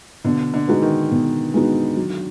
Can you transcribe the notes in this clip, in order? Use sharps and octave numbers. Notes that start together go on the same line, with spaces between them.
B2 D3
D3
G#3 B3 D#4 F#4
D#3
B2
G#3 B3 D#4 F#4
F#3